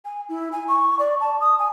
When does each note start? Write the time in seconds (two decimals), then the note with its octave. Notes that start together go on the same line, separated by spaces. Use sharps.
0.05 G#5
0.29 E4
0.52 G#5
0.68 C#6
0.99 D5
1.20 A5
1.41 D#6
1.59 G#5